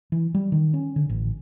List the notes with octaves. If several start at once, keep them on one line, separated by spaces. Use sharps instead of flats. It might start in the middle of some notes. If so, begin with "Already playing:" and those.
E3
G3
D#3
C#4
D3
A1